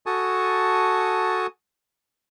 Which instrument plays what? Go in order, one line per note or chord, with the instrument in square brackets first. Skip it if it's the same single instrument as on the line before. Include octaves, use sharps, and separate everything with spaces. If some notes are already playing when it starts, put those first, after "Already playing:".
[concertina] F#4 A4 G#5 A5 C#6 D#6